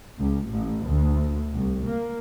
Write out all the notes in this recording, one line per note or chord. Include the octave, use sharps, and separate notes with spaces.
C#2
A1
D2
C2
A#3